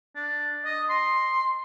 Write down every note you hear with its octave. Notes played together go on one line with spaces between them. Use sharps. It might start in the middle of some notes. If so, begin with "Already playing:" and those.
D4
D#5
C6